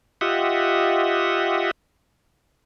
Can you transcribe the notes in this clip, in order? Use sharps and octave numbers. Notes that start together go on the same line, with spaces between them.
F4 G4 D#5 E5 F#5